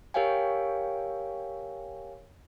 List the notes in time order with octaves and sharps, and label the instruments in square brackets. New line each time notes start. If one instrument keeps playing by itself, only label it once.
[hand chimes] G4 A#4 C#5 F5 G5 G#5